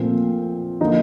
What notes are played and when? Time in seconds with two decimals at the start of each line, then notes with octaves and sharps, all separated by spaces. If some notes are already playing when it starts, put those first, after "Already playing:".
Already playing: A#2 F3 A3 C4
0.81 D3 F3 A#3 D#4